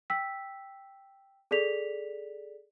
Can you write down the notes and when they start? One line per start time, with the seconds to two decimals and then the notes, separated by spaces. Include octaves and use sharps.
0.10 G5 E6 B6
1.51 G#4 A4 D5 B6 F7